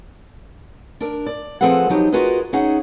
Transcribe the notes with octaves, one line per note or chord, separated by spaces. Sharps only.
D4 A#4
D5
F3 C4 G#4 A4 B4 F#5
F3 F#3 D#4 G4
F4 F#4 G#4 A#4 B4 D#5
C#4 D#4 G#4 E5 F#5